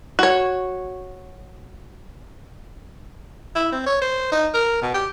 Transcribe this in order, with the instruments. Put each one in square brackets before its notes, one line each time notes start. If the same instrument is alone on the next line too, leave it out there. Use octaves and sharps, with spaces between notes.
[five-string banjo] F#4 C#5
[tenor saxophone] E4
C4
C#5
C5
D#4
A#4
B2
G4